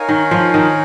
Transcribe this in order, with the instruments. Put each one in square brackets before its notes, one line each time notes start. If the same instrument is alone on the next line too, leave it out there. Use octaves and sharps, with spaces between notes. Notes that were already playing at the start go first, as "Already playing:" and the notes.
Already playing: [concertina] D#4 A#4 C#5 F5 G#5
[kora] D#3
F3
D#3